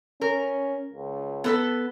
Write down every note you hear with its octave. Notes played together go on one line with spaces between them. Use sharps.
C#4 A#4
C#2
B3 A4 B4